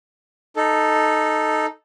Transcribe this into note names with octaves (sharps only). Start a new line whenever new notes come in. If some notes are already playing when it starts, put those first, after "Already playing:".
D#4 A4